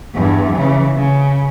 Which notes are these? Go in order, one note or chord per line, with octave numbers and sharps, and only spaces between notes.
E2 G2
C#3 E3
C#3